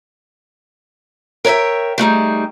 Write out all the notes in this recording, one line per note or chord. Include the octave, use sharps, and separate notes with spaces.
A#4 C#5 D5 E5 G5
G3 A3 D#4 G#4